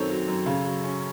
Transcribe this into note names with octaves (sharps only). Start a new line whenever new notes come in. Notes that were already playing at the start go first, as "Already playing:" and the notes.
Already playing: F#2 D#3 C4 A4 C#5
F#3
F#2
C#3
F#3
C#4